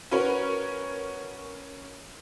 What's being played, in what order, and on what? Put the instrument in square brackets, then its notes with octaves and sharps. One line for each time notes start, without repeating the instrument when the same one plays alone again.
[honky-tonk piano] C#4 F#4 A#4 B4 C#5